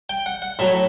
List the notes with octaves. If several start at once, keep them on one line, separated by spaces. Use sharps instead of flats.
G5
F#5
F#5
A2 F#3 E5